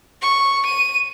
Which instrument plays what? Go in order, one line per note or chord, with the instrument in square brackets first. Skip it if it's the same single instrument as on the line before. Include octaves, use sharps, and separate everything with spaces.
[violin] C#6
D#7